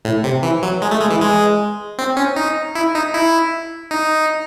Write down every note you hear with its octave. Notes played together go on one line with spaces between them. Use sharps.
A2
C3
E3
F#3
G#3
A3
G#3
E3
G#3
C4
C#4
D#4
E4
D#4
E4
D#4